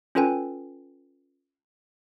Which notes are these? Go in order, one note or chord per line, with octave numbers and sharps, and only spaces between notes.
C#4 F4 A4 B4 G5 G#5